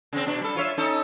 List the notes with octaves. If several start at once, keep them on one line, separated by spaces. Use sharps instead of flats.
C#3 C4
B2 D4
G3 A4
F4 C#5 E5
C#4 D#4 A4